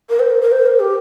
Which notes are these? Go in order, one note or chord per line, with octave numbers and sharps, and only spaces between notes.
A#4
C5
A#4
A#4
C5
A#4
G4